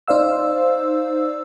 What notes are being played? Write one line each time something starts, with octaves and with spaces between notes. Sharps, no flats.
D#4 C5 D5 F5 E6